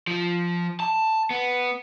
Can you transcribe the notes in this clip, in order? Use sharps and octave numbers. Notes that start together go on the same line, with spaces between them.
F3
A5
B3